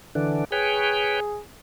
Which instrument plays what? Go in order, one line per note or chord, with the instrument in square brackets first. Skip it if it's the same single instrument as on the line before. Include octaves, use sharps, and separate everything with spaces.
[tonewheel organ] D3 E3 D4
[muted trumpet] G#4 [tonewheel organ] B4 C#5 G5